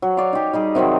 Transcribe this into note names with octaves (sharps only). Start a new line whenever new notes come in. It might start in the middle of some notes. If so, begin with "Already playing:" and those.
F#3
C#5 D5 F5
D#4 G4
G3 D#4 G#4
C3 D#3 F#3 C4